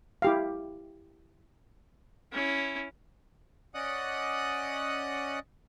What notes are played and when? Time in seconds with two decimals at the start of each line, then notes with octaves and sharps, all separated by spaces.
0.22 E4 G4 F5
2.32 C#4 E4
3.74 C#4 D5 D#5 F#5 D#6 F#6